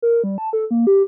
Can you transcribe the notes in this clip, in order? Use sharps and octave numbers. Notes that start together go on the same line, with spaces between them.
A#4
G3
A5
A4
A#3
G4